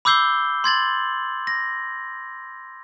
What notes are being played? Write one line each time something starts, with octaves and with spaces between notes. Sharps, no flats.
B5 D6 E6 G6 C7 G7
C6 G#6 A6 F#7
A#6